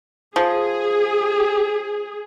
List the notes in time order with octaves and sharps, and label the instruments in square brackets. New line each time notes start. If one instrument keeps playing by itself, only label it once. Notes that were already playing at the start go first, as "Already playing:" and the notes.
[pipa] F3 [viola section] G#4